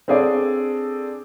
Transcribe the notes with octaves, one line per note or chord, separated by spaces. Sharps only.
C4 D4 G#4 A4 D5